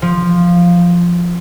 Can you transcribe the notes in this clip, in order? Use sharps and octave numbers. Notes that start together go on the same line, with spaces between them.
F3